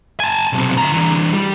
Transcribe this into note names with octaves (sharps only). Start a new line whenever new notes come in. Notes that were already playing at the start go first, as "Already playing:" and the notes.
G#5 A5
B1 C3
D2 A#5
E3 D4
G3